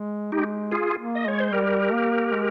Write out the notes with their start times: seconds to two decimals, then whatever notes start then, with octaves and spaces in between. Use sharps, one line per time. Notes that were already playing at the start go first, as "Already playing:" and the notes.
Already playing: G#3
0.32 G#3 D#4 G4
0.72 F4 G#4
0.98 A#3
1.15 D#5
1.26 G#3 C#5
1.40 C5
1.52 G3 G4 A#4
1.92 A#3
2.33 G#3